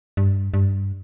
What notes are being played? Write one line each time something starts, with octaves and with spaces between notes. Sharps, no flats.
G2
G2